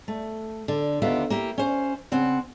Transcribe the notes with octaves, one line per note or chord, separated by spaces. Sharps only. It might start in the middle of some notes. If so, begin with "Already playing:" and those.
A3
D3
D#2 D3 B3 F4 G4 E5
A#3 E4 G4
C#4 C5
C#3 C4 F#5